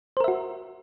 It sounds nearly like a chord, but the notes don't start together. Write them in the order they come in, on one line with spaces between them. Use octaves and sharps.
C5 A#4 E5 F#4